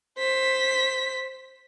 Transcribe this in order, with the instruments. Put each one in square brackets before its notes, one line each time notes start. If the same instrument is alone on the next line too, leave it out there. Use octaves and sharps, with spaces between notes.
[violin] C5 B6